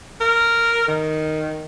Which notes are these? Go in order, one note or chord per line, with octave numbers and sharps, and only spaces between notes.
A#4
D#3